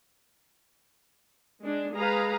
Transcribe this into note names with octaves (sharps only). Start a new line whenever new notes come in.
G#3 D4
G#3 G#4 B4 F5 A#5